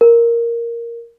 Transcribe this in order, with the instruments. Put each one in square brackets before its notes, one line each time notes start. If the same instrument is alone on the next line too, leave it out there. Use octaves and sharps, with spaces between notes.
[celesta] A#4